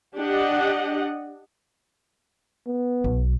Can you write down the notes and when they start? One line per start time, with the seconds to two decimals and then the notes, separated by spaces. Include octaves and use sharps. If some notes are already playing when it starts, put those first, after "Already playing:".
0.15 D4 G4 D#5 F#5
2.67 B3
3.04 B1